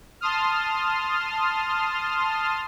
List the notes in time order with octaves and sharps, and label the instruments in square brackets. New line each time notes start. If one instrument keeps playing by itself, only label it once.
[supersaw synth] A5 C6 D#6 F6